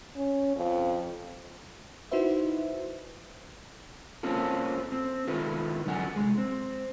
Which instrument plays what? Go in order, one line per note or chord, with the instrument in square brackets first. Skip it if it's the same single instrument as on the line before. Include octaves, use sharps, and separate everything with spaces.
[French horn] C#4
F2
[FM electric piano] D#4 E4 F#4 B4 C5 E5
[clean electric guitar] A#3 C4 C#4 F4 A4
C4
D#3 E4 F4 A4 B4
D3 F#3 D4 F#5 G#5
C2 F#2 G#3
C4